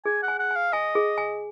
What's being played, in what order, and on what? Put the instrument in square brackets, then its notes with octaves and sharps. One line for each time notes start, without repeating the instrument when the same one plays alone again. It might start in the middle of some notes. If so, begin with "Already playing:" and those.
[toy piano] G#4 [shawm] G#5
[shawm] F#5
[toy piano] G#5
[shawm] F#5
[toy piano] G#5
[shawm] F5
[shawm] D#5 [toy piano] G#5
[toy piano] G#4
G#5